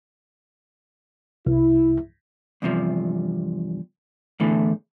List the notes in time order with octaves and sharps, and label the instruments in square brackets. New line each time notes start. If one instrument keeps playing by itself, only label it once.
[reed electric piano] C2 [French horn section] E4
[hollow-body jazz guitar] E2 G2 C3 F3
E2 A2 D3 E3 A3